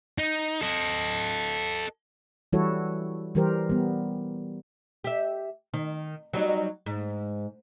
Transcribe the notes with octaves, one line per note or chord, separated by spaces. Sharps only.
D#4
A4 D#5
E3 G3 E4 F#4 A4 C#5
E3 G3 G4 A#4 C5
G3 B3
G4 E5
D#3
F#3 G3 D#4
G#2